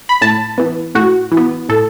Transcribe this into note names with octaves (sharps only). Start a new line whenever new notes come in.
B5
A2 A5
E3 B3
A2 F#4
E3
B3
A2 A4